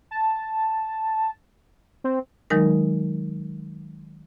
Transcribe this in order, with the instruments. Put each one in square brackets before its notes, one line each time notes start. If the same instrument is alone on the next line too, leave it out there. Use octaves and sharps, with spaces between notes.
[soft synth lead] A5
C4
[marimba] D#3 F#3 G#3 D#4 A#4